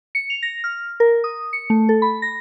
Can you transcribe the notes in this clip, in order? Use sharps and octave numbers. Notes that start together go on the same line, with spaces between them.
C#7
F7
A#6
F6
A#4
D#6
C#7
A3
A4
B5
A#6